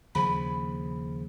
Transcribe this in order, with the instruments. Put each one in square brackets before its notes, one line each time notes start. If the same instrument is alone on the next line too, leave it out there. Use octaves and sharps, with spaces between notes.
[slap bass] D#2 C#3 F3 [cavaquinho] B5